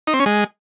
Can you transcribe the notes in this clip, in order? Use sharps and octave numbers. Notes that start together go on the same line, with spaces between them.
D#4
C4
C#4
G#3